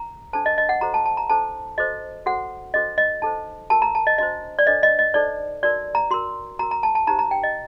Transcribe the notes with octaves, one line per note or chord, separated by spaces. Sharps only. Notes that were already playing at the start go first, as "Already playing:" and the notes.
Already playing: A#5
D4 A4 C5 A5
D#5
D#5
F#5
F#4 A4 C5 A#5
A5
A5
A#5
D#4 A4 C5 A5
F#4 A4 C5 D#5
F#4 A4 C5 F#5
D4 F#4 A4 C5 D#5
D#5
D#4 A4 C5 A5
F#4 A#4 A5
A#5
A5
D#5
D4 F#4 C5 D#5
D5
D4 A4 C5 D#5
D#5
D#5
D#4 A4 C5 D5
D#4 F#4 A#4 D5
A#5
F#4 A#4 C6
F#4 A#4 A#5
A#5
A5
A5
D#4 G4 C5 A#5
A#5
G5
D#5